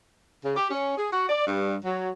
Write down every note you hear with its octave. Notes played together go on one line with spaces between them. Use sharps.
C#3
G4
C#4
G#4
F#4
D5
G2
F#3